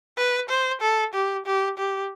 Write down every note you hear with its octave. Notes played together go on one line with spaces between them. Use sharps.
B4
C5
A4
G4
G4
G4